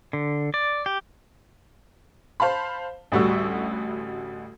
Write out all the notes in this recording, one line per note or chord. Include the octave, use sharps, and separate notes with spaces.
D3
D5
G4
C5 F5 A5 B5
A1 D2 G3 F#4 C#6 E6